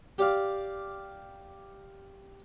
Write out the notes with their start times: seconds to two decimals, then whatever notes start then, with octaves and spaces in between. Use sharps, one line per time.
0.18 G4 D5 F5